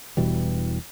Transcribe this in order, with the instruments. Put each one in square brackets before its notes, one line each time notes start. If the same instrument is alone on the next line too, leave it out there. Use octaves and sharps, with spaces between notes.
[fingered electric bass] E1 B2 E3 G3